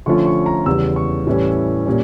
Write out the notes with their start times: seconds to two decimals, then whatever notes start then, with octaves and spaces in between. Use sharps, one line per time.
0.06 D3 F3 A3 C#4 F4 C#6
0.26 C#6
0.46 A#5
0.66 E2 C#3 G3 E6
0.96 C#6
1.27 A2 E3 G3 C#4
1.86 A#2 G3 C#4